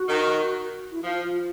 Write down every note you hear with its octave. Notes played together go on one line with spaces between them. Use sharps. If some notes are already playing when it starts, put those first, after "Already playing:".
Already playing: F#4
D#3
E4
F3 F4
F4